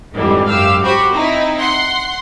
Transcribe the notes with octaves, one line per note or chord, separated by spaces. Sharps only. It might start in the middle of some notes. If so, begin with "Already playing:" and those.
F2 G#2 D3 E3 G3
F#2 G4 F5 E6
F#4 G4 C5 B5 C#6
C4 D#4 E4
F#5 C6